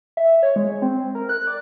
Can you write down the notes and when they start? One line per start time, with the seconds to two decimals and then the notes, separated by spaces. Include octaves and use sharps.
0.17 E5
0.43 C#5
0.56 G#3
0.82 C4
1.15 A#4
1.29 F#6
1.47 D5